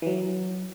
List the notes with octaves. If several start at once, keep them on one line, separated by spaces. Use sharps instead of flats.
E3
F#3